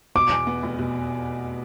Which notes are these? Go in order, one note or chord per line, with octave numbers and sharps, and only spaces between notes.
B2 D6
E2
B3
F1
B2